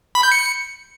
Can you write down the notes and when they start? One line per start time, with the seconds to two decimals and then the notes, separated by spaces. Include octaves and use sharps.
0.15 B5
0.23 G6
0.32 C#7